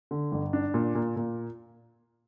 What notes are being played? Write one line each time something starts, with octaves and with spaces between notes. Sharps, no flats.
D3
G1
D4
A#2
A#2
A#2